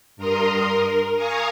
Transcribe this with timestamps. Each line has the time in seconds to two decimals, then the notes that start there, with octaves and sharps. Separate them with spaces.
0.16 G2 A#4 A#5 C6 D#6
0.68 A#4
1.16 F5 G#5 A#5 C#6 D#6